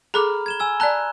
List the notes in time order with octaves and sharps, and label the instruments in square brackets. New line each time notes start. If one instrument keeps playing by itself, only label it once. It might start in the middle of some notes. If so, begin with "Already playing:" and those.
[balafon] G#4 A4 D6 [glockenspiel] A#5 B5 F6
[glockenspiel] G#6 E7 G7
G#5 E6 G#6
[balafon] D5 A5 [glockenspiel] A#5 F#6